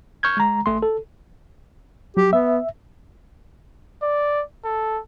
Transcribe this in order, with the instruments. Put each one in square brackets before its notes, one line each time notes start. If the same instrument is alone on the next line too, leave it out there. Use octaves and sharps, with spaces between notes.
[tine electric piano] C#6 F6 G6 G#6
G#3 A#5
G#1 A3 C6
A4
[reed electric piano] F#3 [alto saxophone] G4
[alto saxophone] B3 [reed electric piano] E5
[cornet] D5
A4